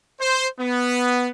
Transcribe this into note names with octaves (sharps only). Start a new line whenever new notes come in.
C5
B3